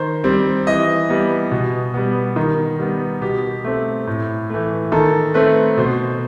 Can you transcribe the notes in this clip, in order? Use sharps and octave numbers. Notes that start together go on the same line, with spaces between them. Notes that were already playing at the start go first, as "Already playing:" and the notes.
Already playing: D#3 C5
G3 C4
E3 D#5
G3 B3
B2
G3 B3
D#3
G3 B3
B2 G4
A3 C4
A2
E3 A3
D#3 A4
A3 C4 B4
B2 C5